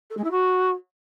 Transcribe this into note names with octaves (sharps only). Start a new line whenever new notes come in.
A4
G#3
E4
F#4